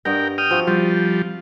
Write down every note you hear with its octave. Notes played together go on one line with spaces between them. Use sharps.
G2 B3 A#4 D#5 G5
G5 D#6 F6
F3 C4 F#4
F3 G3 F4